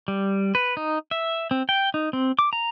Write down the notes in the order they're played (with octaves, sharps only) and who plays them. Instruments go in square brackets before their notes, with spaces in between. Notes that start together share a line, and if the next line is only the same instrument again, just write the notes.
[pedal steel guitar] G3
B4
D#4
E5
C4
G5
D#4
C4
D6
A#5